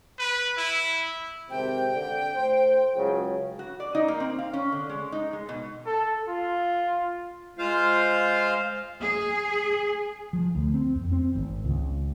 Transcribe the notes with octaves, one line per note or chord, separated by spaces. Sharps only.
B4
E4
G#1 C3 G5
D3
A2 C5
C#2 C#3 F#3
F#4
D5
D#4
A#3
C4
F5
C#4
D3
G#3
D#4
G#3
B2
A4
F4
G#3 F4 C5 F5
G#4
F3
D2
C4
F2
C4
G#1
C#2